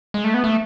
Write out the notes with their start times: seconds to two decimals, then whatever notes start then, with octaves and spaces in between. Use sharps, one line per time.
0.14 G#3
0.24 A3
0.34 B3
0.44 A3